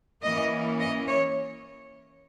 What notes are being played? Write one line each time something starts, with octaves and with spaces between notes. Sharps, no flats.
E3 A#3 C#4 D#5
D#5
C#5